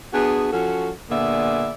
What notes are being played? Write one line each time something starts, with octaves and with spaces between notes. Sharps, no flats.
B3 D4 F#4 G#4
F3 C#4 F#4 A4
A#2 D3 B3 G#4 D5 E5